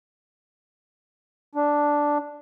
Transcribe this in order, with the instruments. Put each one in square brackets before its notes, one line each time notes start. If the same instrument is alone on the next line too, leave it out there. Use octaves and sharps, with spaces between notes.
[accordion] D4